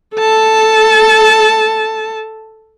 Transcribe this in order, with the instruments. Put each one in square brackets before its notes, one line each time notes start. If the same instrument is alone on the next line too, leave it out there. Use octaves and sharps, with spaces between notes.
[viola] A4 A5